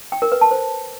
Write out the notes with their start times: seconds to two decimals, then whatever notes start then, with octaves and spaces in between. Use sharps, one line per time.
0.12 G5
0.22 A#4
0.32 B4
0.41 A5
0.51 C5